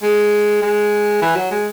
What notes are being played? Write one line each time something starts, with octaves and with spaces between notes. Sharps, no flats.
G#3
G#3
E3
F#3
G#3